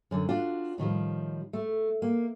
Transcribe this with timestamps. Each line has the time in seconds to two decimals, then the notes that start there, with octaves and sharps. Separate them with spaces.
0.11 F#2 D3
0.29 D4 F4 F#4
0.78 A2 D#3 F3 G3
1.53 A3
2.02 A#3